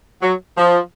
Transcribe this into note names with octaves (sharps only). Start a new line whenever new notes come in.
F#3
F3